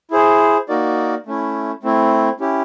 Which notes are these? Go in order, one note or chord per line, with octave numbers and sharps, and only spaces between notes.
E4 G#4 C5
A#3 D#4 F#4 A#4 D5
A3 C#4 E4
A3 C4 E4
C#4 E4 G4